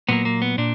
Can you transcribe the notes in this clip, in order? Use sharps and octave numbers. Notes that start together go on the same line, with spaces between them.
A#2 F#3 A#3 B3
A#3
B3
A#2 D4